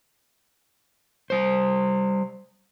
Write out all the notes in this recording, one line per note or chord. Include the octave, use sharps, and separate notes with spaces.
G3 C5